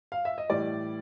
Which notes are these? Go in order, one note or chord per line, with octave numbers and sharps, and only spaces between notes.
F5
E5
D#5
A2 E3 G3 D5